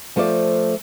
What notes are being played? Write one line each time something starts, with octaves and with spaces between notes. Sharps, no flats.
F3 A3 F4 C5 D5